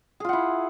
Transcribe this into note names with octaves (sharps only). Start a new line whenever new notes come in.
E4 F4 G#4 F#5